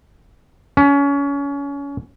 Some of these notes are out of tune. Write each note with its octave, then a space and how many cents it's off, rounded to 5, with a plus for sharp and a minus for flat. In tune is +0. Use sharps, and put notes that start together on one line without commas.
C#4 +25